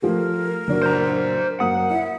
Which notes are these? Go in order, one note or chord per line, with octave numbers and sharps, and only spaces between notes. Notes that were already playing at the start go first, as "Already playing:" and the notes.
F3 A3 G4 A#4
F#1 D4 F#4
C5 A#5
F#2 A#3 F#5 D#6
E4 E5